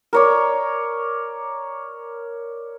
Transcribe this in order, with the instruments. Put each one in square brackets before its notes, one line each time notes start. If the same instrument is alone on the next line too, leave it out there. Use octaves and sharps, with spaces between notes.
[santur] A#4 C#5 D5